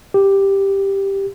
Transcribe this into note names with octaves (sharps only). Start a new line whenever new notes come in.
G4